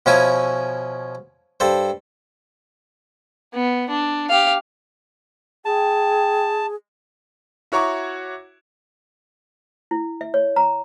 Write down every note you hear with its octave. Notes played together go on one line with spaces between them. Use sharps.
B2 F3 C#4 E4 E5 G#5
G2 A4 C5
B3
D4
G4 F5
G#4 G5 A5
E4 F#4 C#5 A#5 C#6 D6
E4
E5
C#5
A#5